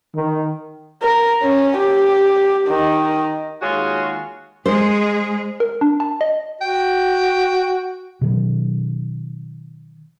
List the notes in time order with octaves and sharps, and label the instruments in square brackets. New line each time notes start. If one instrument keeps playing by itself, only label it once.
[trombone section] D#3
[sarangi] A#4
C#4
G4
D#3
[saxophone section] D#2 G#3 F4 F#4 G#4 C#5
[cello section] G#3 G#4 [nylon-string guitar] C5
[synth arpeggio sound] A#4
D4
A5
D#5
[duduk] F#4 [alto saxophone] G5
[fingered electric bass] B2 D#3 F#3